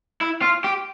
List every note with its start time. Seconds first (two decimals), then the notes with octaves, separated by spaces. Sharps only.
0.21 E4
0.42 F4
0.64 G4